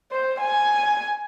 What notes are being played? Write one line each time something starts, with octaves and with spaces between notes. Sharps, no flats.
C5
G#5